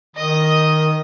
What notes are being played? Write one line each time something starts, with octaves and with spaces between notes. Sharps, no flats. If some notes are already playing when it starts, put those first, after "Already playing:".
D#3 D#5 D#6